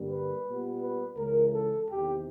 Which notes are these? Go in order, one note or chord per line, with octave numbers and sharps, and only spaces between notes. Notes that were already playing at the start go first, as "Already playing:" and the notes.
Already playing: G2 D3 G3 A#3
B4
A#2 G3 B3
B4
C#2 C#3 E3 G#3 A#4
A4
E2 C3 D#3 G4